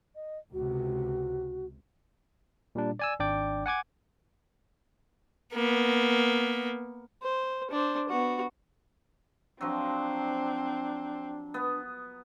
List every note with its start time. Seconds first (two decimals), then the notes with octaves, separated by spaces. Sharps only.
0.16 D#5
0.53 C#2 C3 F#4
2.75 A#2 G3 D4
2.99 D5 G#5 E6
3.20 G#1 D4 D5 G5 D6
3.66 F#5 G#5 D6 G#6
5.54 A#3 B3
7.22 C5
7.71 D4 C5
8.09 B3 F#4
9.61 F3 F#3 C4 D4
11.54 B3